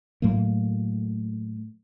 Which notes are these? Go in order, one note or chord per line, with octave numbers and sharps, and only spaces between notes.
A2 F#3 A3 A#3